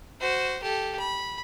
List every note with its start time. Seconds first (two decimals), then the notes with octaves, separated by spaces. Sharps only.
0.21 F#4 C5
0.62 G4 A4
0.99 B5